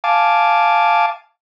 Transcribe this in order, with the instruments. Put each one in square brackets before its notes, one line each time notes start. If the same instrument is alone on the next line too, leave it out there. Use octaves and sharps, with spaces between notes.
[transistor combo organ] F5 G#5 A5 D6